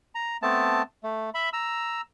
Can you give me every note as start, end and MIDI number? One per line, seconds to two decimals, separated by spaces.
0.15 0.37 82
0.42 0.82 57
0.42 0.82 59
0.42 0.82 60
0.42 0.82 81
1.03 1.30 57
1.34 1.49 76
1.34 1.49 83
1.53 2.01 82
1.53 2.01 88